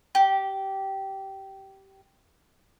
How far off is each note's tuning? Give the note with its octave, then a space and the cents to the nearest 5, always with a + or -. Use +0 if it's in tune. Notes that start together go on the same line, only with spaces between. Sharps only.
G4 -15